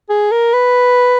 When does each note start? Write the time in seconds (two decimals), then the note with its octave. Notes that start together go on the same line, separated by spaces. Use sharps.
0.09 G#4
0.31 A#4
0.53 B4